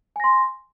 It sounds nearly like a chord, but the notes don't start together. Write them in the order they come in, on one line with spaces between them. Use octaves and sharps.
G#5 A#6 C6